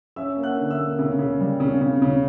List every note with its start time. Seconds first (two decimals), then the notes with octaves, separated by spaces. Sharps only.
0.16 C#4 E5 E6
0.37 A#3
0.43 F#5 F#6
0.57 D3
0.71 E5 E6
0.78 A#3
0.99 C#3
1.19 C#3
1.40 G3
1.60 C#3
1.81 C#3
2.02 C#3